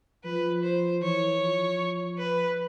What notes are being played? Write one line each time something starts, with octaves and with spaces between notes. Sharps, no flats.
F3 B4
C5
E3 C#5
F3
B4